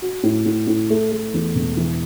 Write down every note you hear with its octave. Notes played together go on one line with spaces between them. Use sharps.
F#4
A2
A2
A2
A3
A3
E2
E1
E3